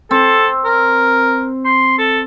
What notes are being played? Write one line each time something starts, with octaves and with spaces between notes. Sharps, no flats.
C4 A4
A#4
C6
A4